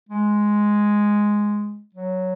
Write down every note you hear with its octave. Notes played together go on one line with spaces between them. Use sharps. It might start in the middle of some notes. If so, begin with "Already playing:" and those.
G#3
F#3